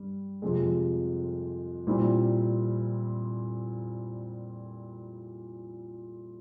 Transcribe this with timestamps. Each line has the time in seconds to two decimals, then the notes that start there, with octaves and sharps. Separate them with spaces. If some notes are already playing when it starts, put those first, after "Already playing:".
Already playing: G2 G3
0.42 F2 C3 F3 G#3
1.87 A#2 G3 C4 E4